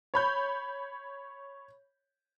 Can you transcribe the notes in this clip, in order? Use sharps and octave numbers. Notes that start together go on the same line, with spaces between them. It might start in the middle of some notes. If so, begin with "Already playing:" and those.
C#5 B5 G6